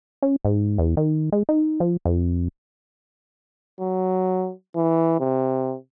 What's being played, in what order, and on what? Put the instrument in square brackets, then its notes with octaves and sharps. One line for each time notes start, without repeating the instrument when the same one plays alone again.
[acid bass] C#4
G#2
E2
D#3
G#3
D#4
F3
F2
[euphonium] F#3
E3
C3